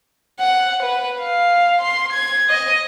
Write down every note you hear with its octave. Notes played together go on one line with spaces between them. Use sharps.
F#5
B4
F5
C6
G#6
D#5